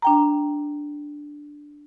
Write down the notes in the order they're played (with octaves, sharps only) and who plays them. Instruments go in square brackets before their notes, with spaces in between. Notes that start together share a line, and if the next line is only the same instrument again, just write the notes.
[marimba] D4 G5 A#5